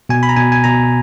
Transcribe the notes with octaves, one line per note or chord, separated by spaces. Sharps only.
B2 G#5
B5
A#5
B2 G#5
G#5
B2 A#5